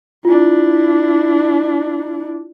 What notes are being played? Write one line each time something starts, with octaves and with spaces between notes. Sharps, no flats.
D4 E4 F4